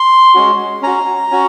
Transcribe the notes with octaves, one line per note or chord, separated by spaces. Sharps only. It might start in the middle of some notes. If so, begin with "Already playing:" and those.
Already playing: C6
G#3 C#4 F#4
C#4 F#4 A#5
C#4 F#4